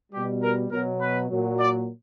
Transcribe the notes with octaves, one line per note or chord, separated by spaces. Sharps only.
B2 G3 G4
A#4
B2 F#3 A#4
B4
A#2 F#3
D5